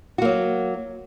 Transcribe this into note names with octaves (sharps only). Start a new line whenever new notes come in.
F#3 A#3 F#4